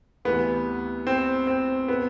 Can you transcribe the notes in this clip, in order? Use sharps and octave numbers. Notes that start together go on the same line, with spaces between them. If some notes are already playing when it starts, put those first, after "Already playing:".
D2 C3 E3 B3
C4
C4
B2 B3